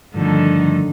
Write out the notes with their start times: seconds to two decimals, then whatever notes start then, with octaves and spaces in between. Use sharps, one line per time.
0.14 G2 D3 D#3 F3 A3